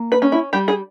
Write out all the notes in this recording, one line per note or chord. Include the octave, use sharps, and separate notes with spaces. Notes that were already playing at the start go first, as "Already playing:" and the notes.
Already playing: A#3
B4
C#4
E4
G3 G4
G#4